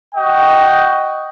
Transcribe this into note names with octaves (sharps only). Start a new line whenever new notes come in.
F#4 D#5 G5